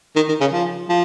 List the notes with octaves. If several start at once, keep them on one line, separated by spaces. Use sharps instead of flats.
D#3
D#3
C#3
F3
F3